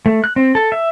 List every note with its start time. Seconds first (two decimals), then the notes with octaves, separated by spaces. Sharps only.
0.06 A3
0.24 F#6
0.36 C4
0.55 A4
0.72 E5